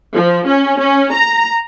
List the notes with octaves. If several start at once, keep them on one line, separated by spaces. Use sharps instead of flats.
F3
C#4
C#4
A#5